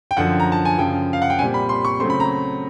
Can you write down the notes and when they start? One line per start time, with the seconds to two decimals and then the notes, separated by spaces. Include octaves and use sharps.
0.11 G5
0.17 F#2 D3 F3 F#5
0.40 A#5
0.52 A5
0.65 G#5
0.78 F#2 C#3 F3 G5
1.13 F5
1.22 F#5
1.30 G5
1.39 A#2 G3 C4 G#5
1.54 B5
1.69 C6
1.85 C#6
2.00 C#3 F#3 A3 C4 C6
2.10 B5
2.20 A#5